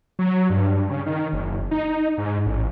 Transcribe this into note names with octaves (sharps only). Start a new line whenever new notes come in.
F#3
G2
C#3
D#3
F#1
D#4
G#2
A1